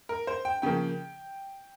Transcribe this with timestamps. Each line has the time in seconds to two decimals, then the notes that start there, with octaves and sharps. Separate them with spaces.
0.09 A#4
0.27 C5
0.45 G5
0.62 C#3 F3 A#3 G5